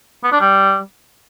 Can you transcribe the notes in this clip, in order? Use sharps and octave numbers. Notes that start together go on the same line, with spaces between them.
B3
D4
G3